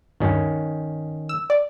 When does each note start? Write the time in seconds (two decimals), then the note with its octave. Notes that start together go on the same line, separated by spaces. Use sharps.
0.20 D2 G2 D#3 C#4
1.29 E6
1.50 D5